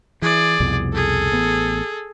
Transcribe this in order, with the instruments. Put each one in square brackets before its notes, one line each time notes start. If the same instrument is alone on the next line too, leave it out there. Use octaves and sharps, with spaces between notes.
[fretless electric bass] E3 [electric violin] G#4 D5
[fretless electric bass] C2 F2 B2
[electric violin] G#4 A4
[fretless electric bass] A1 B3